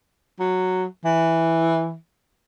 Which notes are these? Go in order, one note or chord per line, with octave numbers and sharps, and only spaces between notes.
F#3
E3